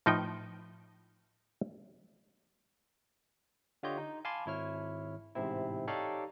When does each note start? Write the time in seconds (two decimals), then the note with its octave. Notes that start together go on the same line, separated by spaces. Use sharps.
0.06 A2 F3 D#4 B4 G5
3.83 D3 F4 G4 C#5 D#5 G6
3.98 D#4
4.25 F5 G#5 A5 B5 C6 D6
4.46 G#1 E4 C#5 F6
5.35 A1 G#2 C3 C4 E4
5.87 D#4 G4 A4 C#5 D5 F5